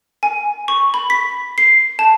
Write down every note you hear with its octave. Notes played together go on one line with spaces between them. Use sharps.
G#5
C#6
B5
B6
C7
A5